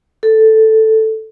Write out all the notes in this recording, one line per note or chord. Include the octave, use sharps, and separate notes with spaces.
A4